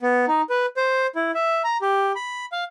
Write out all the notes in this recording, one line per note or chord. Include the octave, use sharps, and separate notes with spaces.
B3
D#4
B4
C5
E4
E5
A#5
G4
B5
F5